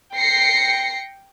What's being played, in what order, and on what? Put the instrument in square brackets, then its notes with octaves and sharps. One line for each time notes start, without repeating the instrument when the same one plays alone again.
[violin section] G5 A#6 C7 C#7